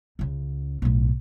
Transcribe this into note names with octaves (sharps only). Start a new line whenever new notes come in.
C#2 C#3
B1 A2